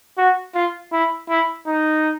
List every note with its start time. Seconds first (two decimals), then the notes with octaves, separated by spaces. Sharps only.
0.17 F#4
0.54 F4
0.92 E4
1.29 E4
1.67 D#4